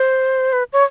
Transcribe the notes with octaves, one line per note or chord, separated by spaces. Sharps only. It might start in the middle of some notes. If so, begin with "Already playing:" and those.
Already playing: C5
B4
C#5